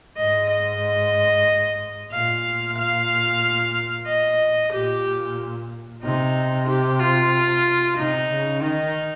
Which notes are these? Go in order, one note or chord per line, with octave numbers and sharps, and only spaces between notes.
G#2 D#5
D#5
A#2 F5
F5
D#5
A#2 G4
C3 D#4
G4
F4
C3 D#4
C#3
D#3 D#4